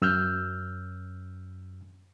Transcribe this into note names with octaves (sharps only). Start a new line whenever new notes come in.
F#2 E6 F6 G6